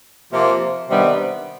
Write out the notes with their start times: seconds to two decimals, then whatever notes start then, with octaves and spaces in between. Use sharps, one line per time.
0.32 C3 F3 A#3
0.89 C3 D#3 G3 B3 D4